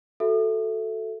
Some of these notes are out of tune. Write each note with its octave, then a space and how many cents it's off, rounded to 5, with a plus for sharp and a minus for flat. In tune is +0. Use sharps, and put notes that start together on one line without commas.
F#4 +0 A4 +0 E5 +5